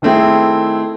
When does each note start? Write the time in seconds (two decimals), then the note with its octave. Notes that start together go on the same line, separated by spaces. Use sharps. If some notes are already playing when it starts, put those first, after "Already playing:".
0.02 D#3 A3 C4 E4 G#4